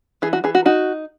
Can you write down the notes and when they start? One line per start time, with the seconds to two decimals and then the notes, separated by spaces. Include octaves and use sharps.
0.22 E3 G#4
0.33 F#4
0.44 E3 G#4
0.55 F#4
0.66 D#4 F#4